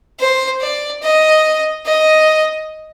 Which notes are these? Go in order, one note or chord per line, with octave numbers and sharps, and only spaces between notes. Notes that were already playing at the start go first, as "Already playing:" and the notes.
C5
D5
D#5
D#5